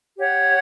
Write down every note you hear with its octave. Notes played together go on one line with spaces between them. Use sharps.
G4 C#5 F#5